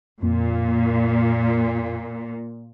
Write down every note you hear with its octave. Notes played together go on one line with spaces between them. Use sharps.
F2 A#2 A#3